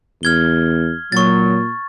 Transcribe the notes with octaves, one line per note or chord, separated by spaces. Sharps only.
E2 F6 G#6 G7
A#2 F#3 C#6 A6